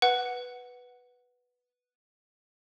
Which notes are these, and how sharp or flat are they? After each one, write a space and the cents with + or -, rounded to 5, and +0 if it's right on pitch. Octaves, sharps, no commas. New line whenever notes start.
B4 +0 F#5 +0